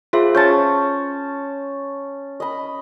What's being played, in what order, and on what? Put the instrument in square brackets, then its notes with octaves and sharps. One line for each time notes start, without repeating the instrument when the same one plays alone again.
[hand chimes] F4 G#4 E5 [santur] C5
[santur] C#4 A5 C#6 [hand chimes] G6 A6
[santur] D#5 B5